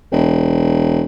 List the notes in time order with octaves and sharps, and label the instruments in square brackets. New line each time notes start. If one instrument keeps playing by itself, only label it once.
[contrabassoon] E1